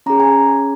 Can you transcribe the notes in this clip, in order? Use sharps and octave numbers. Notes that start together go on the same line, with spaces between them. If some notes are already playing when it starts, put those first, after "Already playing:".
C#4 G#4 A#5
G#5